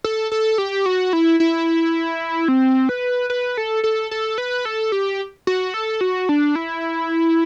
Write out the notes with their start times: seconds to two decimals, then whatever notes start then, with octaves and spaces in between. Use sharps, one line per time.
0.04 A4
0.32 A4
0.58 G4
0.86 F#4
1.13 E4
1.40 E4
2.48 C4
2.89 B4
3.30 B4
3.57 A4
3.84 A4
4.11 A4
4.38 B4
4.65 A4
4.92 G4
5.47 F#4
5.74 A4
6.01 F#4
6.29 D4
6.55 E4